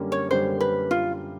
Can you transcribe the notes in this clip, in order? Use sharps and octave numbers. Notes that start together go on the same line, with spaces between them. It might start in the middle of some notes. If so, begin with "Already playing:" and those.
Already playing: F#2 D3 G3 A#3 C#4
C#5
F#2 D3 G3 A#3 C#4 C5
B4
F4